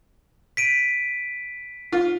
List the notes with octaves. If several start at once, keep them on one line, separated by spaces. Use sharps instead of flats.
B6 D7 D#7
F4